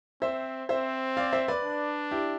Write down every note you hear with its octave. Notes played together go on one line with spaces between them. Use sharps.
C4 C5 E5
C4 C5 E5
D5 F5
C5 E5
B4 D5
D4
E4 G4